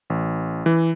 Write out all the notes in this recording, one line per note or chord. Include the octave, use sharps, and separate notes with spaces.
A1
E3